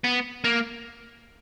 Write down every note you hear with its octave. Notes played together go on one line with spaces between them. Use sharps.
B3
A#3